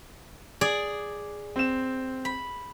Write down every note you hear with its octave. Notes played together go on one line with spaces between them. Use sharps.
G#4 D5
C4 E7
B5